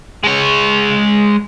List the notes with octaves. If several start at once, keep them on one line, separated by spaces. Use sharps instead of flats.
G#3 C#5